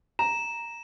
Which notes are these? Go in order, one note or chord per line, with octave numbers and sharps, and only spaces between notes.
A#5 E7